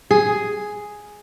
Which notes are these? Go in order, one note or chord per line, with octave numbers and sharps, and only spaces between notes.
G#4